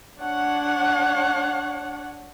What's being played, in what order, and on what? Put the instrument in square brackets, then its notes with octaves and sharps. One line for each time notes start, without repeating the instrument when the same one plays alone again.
[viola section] D4 C#5 F#5